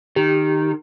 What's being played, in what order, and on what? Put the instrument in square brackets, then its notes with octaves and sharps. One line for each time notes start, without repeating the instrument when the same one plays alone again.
[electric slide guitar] D#3 [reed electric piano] G4